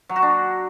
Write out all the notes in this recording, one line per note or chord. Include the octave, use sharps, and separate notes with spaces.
F#3
F#4
D4